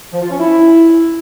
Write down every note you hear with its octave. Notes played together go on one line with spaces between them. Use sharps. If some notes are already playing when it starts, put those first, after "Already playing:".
F3
F4
C#4
E4